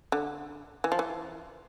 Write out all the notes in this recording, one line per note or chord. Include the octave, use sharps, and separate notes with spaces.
D3
E3
F3
E3